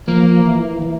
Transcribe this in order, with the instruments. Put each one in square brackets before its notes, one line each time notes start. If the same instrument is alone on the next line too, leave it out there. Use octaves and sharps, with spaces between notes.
[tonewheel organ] F3 [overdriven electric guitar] A#3
[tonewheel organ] E3
E3